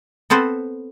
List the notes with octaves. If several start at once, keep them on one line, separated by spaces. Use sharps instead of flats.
B3 C4 A4 B4 C5